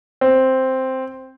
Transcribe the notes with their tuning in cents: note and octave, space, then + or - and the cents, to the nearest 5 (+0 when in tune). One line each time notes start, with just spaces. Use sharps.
C4 +0